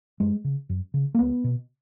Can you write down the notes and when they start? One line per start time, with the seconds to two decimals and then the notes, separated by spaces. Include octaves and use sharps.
0.20 F#2 G#3
0.44 C#3
0.69 F#2
0.94 C#3
1.15 A#3
1.19 C#2 B3
1.44 B2